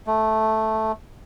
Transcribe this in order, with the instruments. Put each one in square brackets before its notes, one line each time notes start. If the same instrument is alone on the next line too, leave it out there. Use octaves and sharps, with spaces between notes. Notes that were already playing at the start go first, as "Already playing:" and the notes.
[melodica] A3